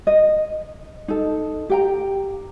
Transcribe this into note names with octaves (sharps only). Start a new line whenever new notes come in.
D#5
D#4 A4
G4 G5 A#5